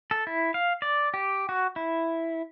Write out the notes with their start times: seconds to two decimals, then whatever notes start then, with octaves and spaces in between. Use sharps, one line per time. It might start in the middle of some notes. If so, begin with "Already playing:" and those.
0.11 A4
0.27 E4
0.54 F5
0.82 D5
1.14 G4
1.49 F#4
1.76 E4